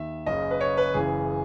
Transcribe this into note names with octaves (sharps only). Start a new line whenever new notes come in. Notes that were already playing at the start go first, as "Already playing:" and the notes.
Already playing: D#2 D#3 E5
F#1 F#2 C#3 D#5
B4
C#5
B4
F#1 F#2 C#3 E3 G#4